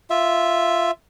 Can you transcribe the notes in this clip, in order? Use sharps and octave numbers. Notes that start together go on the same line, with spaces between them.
F4 E5